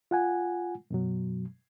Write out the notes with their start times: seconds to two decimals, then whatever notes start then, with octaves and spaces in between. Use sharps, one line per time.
0.11 F4 F#5 G#5
0.91 F#2 B2 F#3